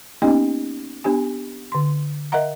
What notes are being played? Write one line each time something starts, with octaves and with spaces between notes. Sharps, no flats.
A#3 B3 C#4 D#4 G4 D#5
B3 D4 G4 G#5
D3 C6
A#4 D#5 E5 F#5 A#5